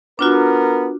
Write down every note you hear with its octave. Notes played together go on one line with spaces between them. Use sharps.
B3 D4 F4 F#4 A#4